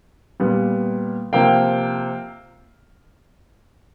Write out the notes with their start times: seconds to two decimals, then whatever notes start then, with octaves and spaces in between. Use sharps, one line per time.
0.40 A#2 G3 B3
1.33 C3 F3 A#3 F5 G5